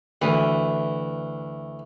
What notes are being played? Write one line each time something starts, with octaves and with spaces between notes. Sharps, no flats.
D2 E3